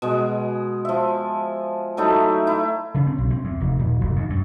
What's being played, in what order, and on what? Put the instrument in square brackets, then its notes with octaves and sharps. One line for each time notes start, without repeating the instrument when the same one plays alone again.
[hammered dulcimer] B2 G#3
F3 E5
F#3 A3 D#4 E4
E4
[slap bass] C#3
C4
B1
C4
E2
F1
D#1
F1
D#2
F#2